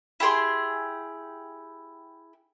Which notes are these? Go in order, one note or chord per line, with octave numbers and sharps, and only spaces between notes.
E4 G4 G#4 C6